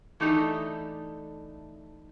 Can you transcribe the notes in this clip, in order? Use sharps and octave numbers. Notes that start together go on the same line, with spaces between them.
E3 A3 D4 D#4 G4 A4